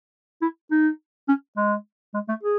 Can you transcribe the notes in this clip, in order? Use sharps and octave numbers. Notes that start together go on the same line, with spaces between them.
E4
D#4
C#4
G#3
G#3
A3
G#4